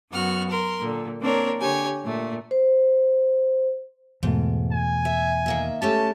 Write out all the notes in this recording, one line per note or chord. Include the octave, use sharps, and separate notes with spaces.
F#2 B3 F#4 F6
A#4 C6
A#2 D3
A#3 C4 D4 A#4 C#5
D3 G4 C#5 G#5
A#2 A3
C5
E2 G#2 B2 A3
G#5
E5
D#3 A#3 E5
A3 C#4 G4 A5